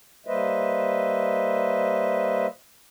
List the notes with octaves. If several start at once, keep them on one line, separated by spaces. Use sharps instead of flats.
G3 A#3 B4 C5 D#5 E5